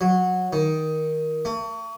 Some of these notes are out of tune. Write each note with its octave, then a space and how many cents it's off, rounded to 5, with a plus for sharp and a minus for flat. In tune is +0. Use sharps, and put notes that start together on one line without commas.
F#3 -15
D#3 +10
A3 +45